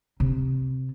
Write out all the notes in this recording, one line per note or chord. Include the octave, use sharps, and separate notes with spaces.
C3